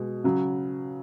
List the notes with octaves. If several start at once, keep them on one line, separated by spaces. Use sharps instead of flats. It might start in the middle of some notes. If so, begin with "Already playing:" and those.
Already playing: B2 G#3
C#3 F#3